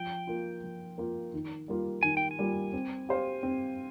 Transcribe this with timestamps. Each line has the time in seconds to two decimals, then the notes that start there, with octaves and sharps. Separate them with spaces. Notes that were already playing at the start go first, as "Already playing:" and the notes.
Already playing: F3 G5
0.27 A#3 F4
0.63 F3
0.98 A#3 F4
1.34 D#3
1.68 G3 A#3 F4
2.03 D#3 G#5
2.17 G5
2.31 G#5
2.39 G3 A#3 F4
2.73 C4
3.09 G4 C5 F5
3.43 C4